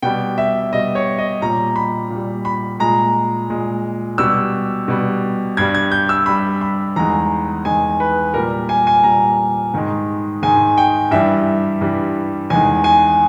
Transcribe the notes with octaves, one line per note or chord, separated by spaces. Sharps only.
B2 G3 G5
E5
B2 G3 D#5
C#5
D#5
A#2 G3 A#5
B5
A#2
G3
B5
A#2 G#3 A#5
A#2 G#3
B2 G3 E6
B2 G3
G2 G3 G#6
G#6
G6
E6
G2 G3 B5
B5
E2 D#3 G#3 A#5
E2 D#3 G#3 G#5
B4
A#2 G3 A#4
G#5
G#5
A#2 G3 A#5
G#2 D#3 G#3
G#2 D#3 G#3 G#5
G5
G2 E3 G3 E5
G2 E3 G3
E2 D#3 G#3 G#5
G#5